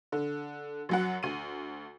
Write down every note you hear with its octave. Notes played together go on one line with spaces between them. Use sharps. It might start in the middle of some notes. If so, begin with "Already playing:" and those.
D3
F#2 F#3 F#5
D2 D#7